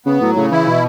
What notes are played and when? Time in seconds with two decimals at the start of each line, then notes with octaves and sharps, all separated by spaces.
0.06 C#3 B3
0.21 A2 F#3
0.36 A2 C#3
0.51 E3 E4
0.67 B2 E3